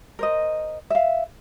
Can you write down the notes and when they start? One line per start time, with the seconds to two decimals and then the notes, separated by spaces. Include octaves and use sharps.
0.19 A#4 C5 D#5
0.90 E5 F5